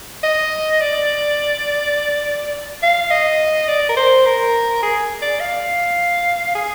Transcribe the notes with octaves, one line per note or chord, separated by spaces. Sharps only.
D#5
D5
F5
D#5
D5
A#4
C5
A#4
G#4
D5
F5
G#4